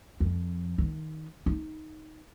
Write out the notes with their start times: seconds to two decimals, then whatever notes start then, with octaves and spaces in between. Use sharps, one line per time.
0.20 F2
0.78 D#3
1.46 D#4